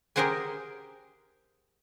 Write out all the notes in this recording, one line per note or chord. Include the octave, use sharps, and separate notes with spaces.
G4 G#4 A#4 C5 F#5 G#5